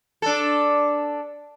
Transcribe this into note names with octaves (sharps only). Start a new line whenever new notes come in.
D4 A4